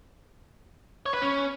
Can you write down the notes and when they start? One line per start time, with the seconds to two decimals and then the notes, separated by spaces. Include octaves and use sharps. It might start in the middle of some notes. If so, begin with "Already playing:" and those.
1.06 C#5
1.14 B4
1.22 C#4